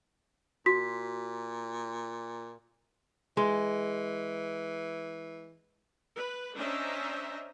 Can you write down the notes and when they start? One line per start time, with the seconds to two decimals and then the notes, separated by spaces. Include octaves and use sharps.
0.66 A#2 F#4 B6
3.37 E3 G#3
6.14 B4
6.56 C#4 D4 C5 D#5 E5 A#5